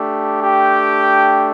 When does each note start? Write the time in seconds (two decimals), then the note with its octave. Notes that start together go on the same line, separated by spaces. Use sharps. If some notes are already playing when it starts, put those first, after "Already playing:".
Already playing: A3 D4 G4
0.43 G4 G5